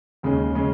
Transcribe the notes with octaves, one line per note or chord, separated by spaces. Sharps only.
D#2 C#3 G#3 C#4
C#3 G#3 C#4